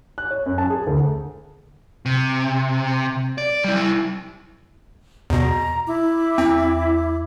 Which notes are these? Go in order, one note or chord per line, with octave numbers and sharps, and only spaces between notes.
F#6
C#5
F#2
A5
G#4
D2
C3
D5
G3 E4
E2 B2 A#5
E4 D6
E2 C4